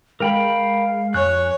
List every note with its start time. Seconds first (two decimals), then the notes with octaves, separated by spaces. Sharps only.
0.20 G#3 A#4 F5 G5 B5
1.14 F2 C#5 G#5 F#6